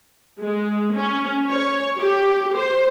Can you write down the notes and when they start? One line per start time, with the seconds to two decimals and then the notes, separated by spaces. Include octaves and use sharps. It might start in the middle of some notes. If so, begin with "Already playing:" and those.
0.40 G#3
0.95 C#4
1.48 C#5
1.99 G4
2.56 C5